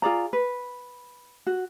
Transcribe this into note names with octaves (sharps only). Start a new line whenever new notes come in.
F4 G#4 D5 A#5
B4
F#4